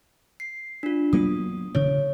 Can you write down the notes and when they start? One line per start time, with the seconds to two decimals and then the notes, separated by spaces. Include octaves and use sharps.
0.40 C7
0.83 D4 F4
1.13 F#3 A#3 B3 D#6
1.75 A1 C#3 C#5